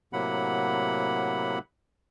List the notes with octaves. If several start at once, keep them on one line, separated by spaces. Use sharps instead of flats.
A2 C3 F#3 A#3 F#5 B5